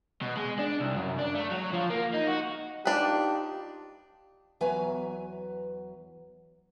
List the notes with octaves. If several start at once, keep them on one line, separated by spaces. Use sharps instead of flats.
B2
G#3
D4
C2
F#2
D4
A3
F#3
F3
A#3
D#4
F#4
D4 D#4 F4 G4 B4
E2 F#3 B4 E5 G#5 A#5